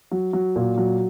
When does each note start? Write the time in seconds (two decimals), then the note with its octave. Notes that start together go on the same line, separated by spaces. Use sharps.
0.11 F#3
0.33 F#3
0.56 A#2
0.78 F#3